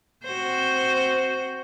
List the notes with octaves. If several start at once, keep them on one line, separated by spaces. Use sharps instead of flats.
C4 F#4 C5